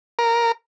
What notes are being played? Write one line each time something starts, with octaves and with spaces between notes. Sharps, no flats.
A#4